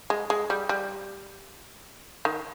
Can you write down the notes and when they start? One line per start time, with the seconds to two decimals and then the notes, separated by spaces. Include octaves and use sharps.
0.10 G#3
0.30 G#3
0.50 G3
0.69 G3
2.25 D#3